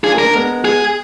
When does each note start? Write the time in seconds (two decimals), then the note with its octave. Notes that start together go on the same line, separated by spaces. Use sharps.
0.04 D4 F4 G#4
0.14 A#3 D4
0.18 A#4
0.24 A#3 D4
0.34 G#3 B3
0.65 G#4